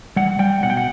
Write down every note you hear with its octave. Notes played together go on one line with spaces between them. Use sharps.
G3 F#5
G3 G5
B2 F#5
G5
F#5